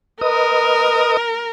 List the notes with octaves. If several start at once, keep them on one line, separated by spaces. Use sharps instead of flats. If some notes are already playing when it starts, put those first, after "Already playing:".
A#4 B4 D#5 D#6